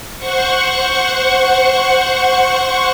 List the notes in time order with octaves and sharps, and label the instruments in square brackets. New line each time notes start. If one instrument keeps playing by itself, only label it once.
[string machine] C5 F#5 C#6